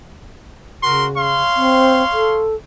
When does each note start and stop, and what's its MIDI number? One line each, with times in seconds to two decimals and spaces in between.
0.83 1.42 49
0.83 1.07 66
0.83 1.07 70
0.83 1.07 84
1.16 2.46 73
1.16 2.46 77
1.16 2.46 84
1.56 2.03 60
2.13 2.55 69